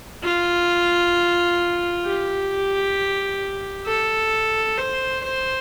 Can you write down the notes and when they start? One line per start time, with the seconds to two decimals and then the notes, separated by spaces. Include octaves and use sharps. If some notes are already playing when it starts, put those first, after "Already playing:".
0.23 F4
2.06 G4
3.87 A4
4.78 C5
5.23 C5